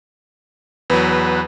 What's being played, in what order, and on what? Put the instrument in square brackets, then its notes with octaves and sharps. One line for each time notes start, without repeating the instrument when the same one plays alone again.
[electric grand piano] E2 F#3 [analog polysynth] B4